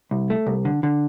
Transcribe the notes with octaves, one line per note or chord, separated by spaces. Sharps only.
C2
A3
C2
D3
D3